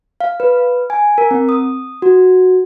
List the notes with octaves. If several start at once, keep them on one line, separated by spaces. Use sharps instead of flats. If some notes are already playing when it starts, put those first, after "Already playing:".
F5
B4
G#5
A#4
C4
D#6
F#4